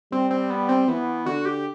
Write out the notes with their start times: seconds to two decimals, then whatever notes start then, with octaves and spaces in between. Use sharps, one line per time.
0.12 G3 C4
0.31 C4
0.50 B3
0.69 C4
0.88 E3 B3
1.26 D3 F#4
1.45 G4